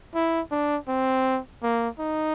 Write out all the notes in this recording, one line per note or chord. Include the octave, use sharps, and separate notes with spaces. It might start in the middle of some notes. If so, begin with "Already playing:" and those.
E4
D4
C4
A#3
D#4